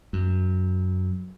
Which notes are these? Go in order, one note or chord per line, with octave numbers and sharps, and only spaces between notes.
F#2